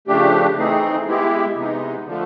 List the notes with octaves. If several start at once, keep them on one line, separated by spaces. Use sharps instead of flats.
C#3 F3 A3 D4 G4
E3 A3 C4 D#4 G#4
G#3 B3 E4 G4
C3 E3 G#3 B3 D#4
D3 F3 A3